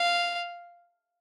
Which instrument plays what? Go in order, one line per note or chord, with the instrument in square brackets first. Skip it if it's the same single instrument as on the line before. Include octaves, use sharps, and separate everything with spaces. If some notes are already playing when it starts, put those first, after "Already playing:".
Already playing: [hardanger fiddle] F5